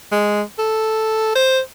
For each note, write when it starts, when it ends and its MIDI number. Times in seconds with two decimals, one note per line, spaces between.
0.12 0.41 56
0.59 1.31 69
1.35 1.59 72